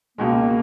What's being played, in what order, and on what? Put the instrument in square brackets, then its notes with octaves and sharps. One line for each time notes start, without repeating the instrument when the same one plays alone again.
[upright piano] C#2 B2 G#3 [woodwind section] A#3